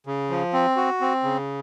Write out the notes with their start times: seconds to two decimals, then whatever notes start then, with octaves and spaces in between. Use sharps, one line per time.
0.07 C#3
0.30 F3
0.53 C4
0.77 F#4
1.01 C4
1.23 C#3